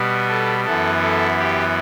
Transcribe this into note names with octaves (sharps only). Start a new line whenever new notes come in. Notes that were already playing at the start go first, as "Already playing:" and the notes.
Already playing: B2 G3 B3
A4
F#2 E3 B3 A4
A4
G4